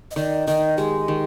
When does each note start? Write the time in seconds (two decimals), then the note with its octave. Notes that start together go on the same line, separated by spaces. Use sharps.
0.11 D#5
0.16 D#3 D5
0.47 D#3 D#5
0.77 G#3 G4
1.08 D#3